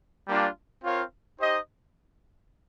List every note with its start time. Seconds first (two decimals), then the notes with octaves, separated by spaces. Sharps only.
0.28 G3 A#3 D4 F4
0.84 C4 F4 A#4 C#5 F5
1.39 D#4 G4 C5 D#5